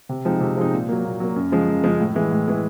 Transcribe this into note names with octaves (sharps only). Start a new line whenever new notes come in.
C3
F3 G#3 C4 D#4
C3
F3 G#3 C4 D#4
A#2
F#3 A#3
A#2
F#3 A#3
F#2
C#3 F3 G#3
F#2
C#3 F3 G#3
A2
E3 G#3
A2
E3 G#3